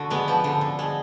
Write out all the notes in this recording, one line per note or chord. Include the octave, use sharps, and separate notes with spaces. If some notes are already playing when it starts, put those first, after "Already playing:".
Already playing: D3 F#4
G#3 B3
F3
D3
D3
G#3